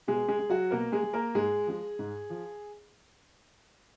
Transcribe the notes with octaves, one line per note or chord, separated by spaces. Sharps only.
B2 G#3 G#4
G#3 G#4
G#3
F#3 F#4
B2 A#3 A#4
G#3 G#4
G#3
A#3 A#4
G#2 G#3 G#4
F3 G#3
G#2
F3